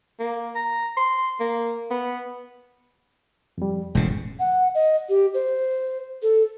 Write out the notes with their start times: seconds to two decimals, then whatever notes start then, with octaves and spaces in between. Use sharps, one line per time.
0.20 A#3
0.56 A#5
0.97 C6
1.40 A#3
1.91 B3
3.58 F2 G3
3.95 E1 A2 C#3 G#3
4.40 F#5
4.75 D#5
5.09 G4
5.34 C5
6.22 A4